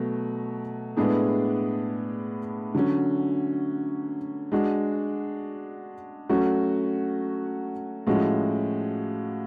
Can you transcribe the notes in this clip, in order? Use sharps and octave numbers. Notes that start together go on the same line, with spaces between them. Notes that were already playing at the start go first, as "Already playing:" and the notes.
Already playing: B2 F#3 A3
A2 G#3 B3 D4 G#4
D3 F#3 C#4
G#3 D4 F#4
F#3 A3 C#4 F#4
A2 F3 G#3 C#4 F#4